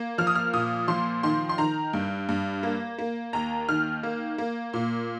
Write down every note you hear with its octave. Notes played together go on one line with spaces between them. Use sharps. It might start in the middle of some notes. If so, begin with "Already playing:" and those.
Already playing: A#3
F3 F6
D#6
F6
A#2 D#6
F3 C6
D#3 C6
C6
D#3 A#5
G2
G2
A#3
A#3
D#2 A#5
D#3 F6
A#3
A#3
A#2